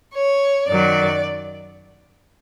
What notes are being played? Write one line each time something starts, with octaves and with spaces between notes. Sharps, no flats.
C#5
F#2 D#3 F#3 D5